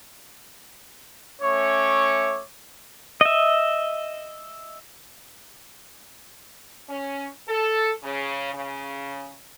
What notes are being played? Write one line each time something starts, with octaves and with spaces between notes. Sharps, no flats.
A3 C#4 C#5 E5 C#6 D6
D#5 E5
C#4
A4
C#3
C#3